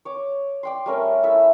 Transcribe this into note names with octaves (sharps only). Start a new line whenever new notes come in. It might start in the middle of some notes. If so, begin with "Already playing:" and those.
C#5 D6
D5 G5 C6
G3 A3 C#4 A#4
E4 A4 E5